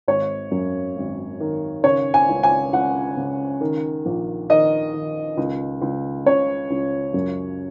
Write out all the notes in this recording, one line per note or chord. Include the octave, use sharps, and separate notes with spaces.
G#1 C#5
F#2
G#1
D#3
C#3 C#5
G#5
C#2
G#5
C#2 F#5
C#3
D#3
A#1
D#3 D#5
D#3
C#2
C#2
C#3 C#5
C#2
F#2